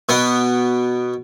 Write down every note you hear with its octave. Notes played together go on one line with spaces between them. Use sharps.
B2 B3